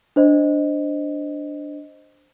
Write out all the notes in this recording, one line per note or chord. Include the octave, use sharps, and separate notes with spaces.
D4 C5 D#5